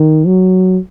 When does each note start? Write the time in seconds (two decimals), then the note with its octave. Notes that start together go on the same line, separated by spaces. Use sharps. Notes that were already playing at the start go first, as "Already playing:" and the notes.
Already playing: D#3
0.27 F#3